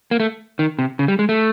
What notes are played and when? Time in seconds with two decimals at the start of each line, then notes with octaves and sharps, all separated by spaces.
0.11 A#3
0.20 A3
0.59 D#3
0.79 C3
0.99 C#3
1.08 G3
1.19 G#3
1.29 A3